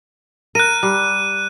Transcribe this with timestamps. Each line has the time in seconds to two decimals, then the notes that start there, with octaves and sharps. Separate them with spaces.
0.55 A#4 F#6 D#7
0.83 G3